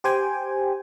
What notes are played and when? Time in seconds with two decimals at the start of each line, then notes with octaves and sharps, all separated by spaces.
0.04 G4 C5 G5 G#5